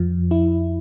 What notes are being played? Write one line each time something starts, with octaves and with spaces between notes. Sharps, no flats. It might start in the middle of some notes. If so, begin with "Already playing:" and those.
Already playing: F2 F3
E4